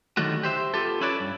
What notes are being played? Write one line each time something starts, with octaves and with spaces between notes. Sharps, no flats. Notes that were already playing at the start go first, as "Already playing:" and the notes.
D3 D#3 F#3 G3 A3 F#4
G4 C5 E5
B3 F4 G4 A4
C#4 E4 A4 B4 C#5 D5
G2